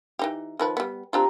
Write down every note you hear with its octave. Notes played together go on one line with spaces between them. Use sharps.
E3 D#4 G4
D#3 F3 B4
G3 B3
C4 D4 F4 G4 A#5